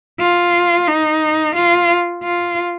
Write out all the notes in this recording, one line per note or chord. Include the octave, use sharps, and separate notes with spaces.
F4
D#4
F4
F4